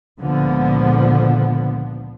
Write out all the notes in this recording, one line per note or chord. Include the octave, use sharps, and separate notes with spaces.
C#2 A#2 D3 F3 B3